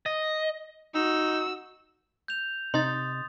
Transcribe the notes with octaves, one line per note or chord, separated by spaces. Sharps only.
D#5
D#4 F#4 E6
G6 F7
C3 D#4 C6 D#6 A6